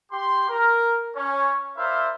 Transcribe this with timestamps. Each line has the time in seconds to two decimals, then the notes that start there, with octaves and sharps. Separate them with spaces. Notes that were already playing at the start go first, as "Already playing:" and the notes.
0.12 G4 C6
0.49 A#4
1.16 C#4 C#5
1.77 E4 A#4 C5 D5 E5 F5